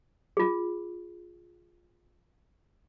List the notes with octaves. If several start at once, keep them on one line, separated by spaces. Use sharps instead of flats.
F4 G#4